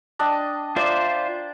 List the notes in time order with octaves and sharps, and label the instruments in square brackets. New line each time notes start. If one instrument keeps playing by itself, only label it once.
[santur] D4 D#5 G5
[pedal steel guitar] F4 C5 E5 [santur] D5 A#5 D6